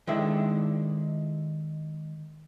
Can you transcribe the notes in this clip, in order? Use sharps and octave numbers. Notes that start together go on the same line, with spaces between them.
D#3 G#3 D4 E4 A4 E5